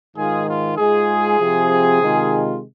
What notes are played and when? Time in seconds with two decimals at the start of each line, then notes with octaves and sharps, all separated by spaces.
0.15 G#2 D#3 G#3 F4 G#4
0.47 F4
0.77 G#2 G#3 F4 G#4
1.39 C3 F3 C4
2.01 C3 D#3 G#3 F4